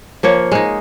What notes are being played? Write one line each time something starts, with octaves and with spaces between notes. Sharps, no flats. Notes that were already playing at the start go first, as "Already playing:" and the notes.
F3 A#3 C#5
G#3 D#4